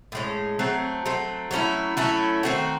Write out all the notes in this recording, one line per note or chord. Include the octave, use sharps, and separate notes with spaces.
A2 G#3 C#4
F#3 A3 C4
F#3 A3 C4
F#3 A3 C#4 E4
F#3 A3 C#4 E4
D#3 A3 C4 F#4